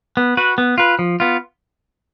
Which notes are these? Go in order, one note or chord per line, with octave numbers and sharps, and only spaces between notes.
B3
F#4 B4
B3
F4 B4
F3
B3 F4